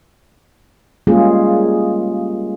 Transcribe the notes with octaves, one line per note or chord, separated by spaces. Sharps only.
G3 G#3 A#3 C#4 F4 G#4